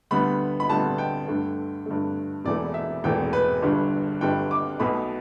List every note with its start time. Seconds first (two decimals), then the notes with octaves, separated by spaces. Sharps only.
0.11 D2 D3 G3 B3 B5
0.60 B5
0.69 D2 D3 G3 B3 A5
0.98 G5
1.28 G2 D3 A3
1.86 G2 D3 A3
2.45 E1 E2 E3 A3 D5
2.74 E5
3.04 E1 E2 E3 A3 G5
3.33 B4
3.62 G1 G2 D3 G3
4.21 G1 G2 D3 G3 G5
4.51 D6
4.80 B1 B2 A3 B5